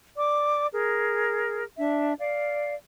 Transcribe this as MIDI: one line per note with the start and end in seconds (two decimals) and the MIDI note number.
0.16 0.68 74
0.16 0.68 86
0.72 1.63 68
0.72 1.63 70
1.78 2.13 62
1.78 2.13 76
2.19 2.74 74
2.19 2.74 77